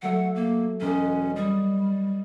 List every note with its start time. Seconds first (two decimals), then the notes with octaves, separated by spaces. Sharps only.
0.02 F#3 A3 E5 F#5
0.36 A#3
0.81 E1 C#4 D#5 F#6
1.36 G3 D#6